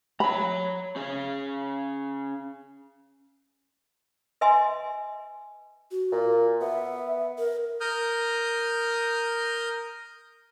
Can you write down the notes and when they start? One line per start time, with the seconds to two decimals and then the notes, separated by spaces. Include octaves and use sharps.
0.20 C#5 A#5 B5
0.96 C#4 G#4 C#5
4.41 B4 D#5 E5 G#5 C6
5.91 F#4
6.12 A#2
6.61 B3 E5
7.38 A#4
7.81 A#4 D#6 F6 G6